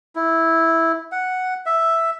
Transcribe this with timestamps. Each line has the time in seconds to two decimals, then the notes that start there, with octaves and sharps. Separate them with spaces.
0.15 E4
1.12 F#5
1.66 E5